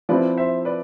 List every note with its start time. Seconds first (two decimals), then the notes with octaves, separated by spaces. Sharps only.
0.09 F3 C4 E4 B4 D5
0.37 C5 E5
0.65 B4 D5